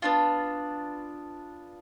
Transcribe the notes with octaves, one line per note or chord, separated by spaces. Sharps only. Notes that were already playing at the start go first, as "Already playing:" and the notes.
B3 D4 F4